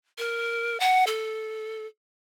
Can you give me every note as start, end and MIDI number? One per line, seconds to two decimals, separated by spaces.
0.18 0.80 70
0.80 1.04 78
1.07 1.86 69